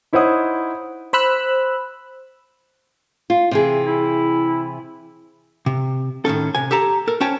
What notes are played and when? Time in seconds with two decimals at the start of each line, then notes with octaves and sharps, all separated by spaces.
0.13 D#4 E4 C5 C#5 F#5 D#6
1.13 C5 B5 E6 F#6
3.30 F4
3.51 C3 E3 G#4
3.85 E4
5.66 C3
6.25 A2 D#3 C#4 A4
6.55 C3 G#5
6.71 G4 A4 A5 A#5
7.07 A4 A#4
7.21 C#4 C5 C#5 G5 A5